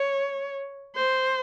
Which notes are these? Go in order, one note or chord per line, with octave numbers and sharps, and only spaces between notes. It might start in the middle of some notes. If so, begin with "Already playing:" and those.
Already playing: C#5
C5